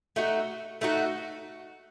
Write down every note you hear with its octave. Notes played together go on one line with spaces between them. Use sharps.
A3 D#4 F#4
A3 D#4 F#4